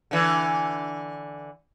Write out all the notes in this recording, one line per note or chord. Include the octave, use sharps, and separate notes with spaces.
D3 E3